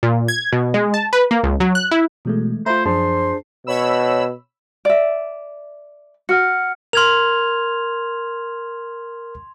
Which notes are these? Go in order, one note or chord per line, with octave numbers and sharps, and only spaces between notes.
A#2
G#6
B2
G#3
A5
B4
A#3
C#2
F#3
F#6
E4
B2 E3 G#3 A3
A3 F4 C5 E5 A#5 B5
F#2 F3 D4 G#4 C5 A5 C6
B2 C#5 B5 E6
D5 E5
F#4 F#5 F6 C#7
A#4 C6 F6 G#6 F7